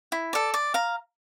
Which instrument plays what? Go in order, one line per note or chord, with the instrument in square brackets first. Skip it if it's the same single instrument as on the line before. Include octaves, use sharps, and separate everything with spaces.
[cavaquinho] E4
A4 D5
D5
F5 A#5